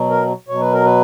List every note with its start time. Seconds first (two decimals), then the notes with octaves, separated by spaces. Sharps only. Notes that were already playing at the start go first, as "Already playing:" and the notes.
Already playing: B2 F#3
0.10 A#4
0.48 B2 F#3 C#5
0.61 B4
0.73 A#4
0.85 B4